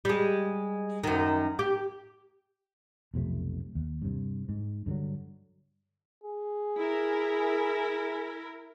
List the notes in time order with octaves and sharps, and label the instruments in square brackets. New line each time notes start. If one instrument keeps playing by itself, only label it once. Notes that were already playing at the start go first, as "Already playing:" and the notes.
[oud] G3 G#3
F#2 D#3
G4
[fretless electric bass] B1 F2 C3 A3
D#2
G2 C3
G#2
G2 D3 F3 F#3
[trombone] G#4
[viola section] E4 A#4